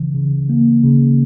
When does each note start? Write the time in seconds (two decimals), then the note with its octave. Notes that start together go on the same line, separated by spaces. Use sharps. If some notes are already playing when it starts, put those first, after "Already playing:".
Already playing: C#3 E3
0.15 C#3
0.49 A#3
0.84 C#3